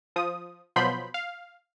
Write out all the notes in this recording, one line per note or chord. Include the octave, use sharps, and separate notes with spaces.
F3 D#6
B2 F3 F#3 B5 C6 G6
F5